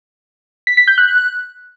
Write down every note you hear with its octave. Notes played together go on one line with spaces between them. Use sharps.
B6
B6
G6
F#6